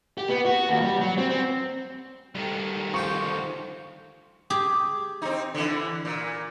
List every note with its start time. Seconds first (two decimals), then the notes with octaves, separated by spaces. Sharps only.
0.18 G4
0.29 B3
0.45 F#4
0.69 D#2
0.81 G3
1.00 F#3
1.18 C4
1.29 C4
2.35 D2 D#3 G3
2.94 F3 G4 G5 C#6
4.50 G4 G#4
5.22 C4 D#4
5.54 D3 E3
6.05 A#2